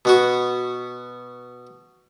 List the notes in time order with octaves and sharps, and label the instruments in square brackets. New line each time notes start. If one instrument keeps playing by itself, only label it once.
[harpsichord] B2 B3 F#4